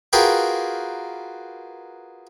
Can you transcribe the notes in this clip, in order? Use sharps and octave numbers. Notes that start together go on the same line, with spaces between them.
F4 F#4 G#4 A#4 B4 G5